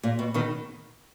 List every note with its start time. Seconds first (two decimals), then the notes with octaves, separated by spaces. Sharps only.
0.03 A#2
0.19 B2
0.34 B2 D#3